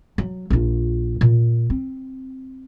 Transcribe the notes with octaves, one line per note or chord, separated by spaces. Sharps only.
F#3
A#1 F4
A#2
C4